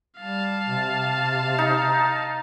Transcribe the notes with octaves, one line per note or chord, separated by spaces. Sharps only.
G3 F5 A5
C3
D#4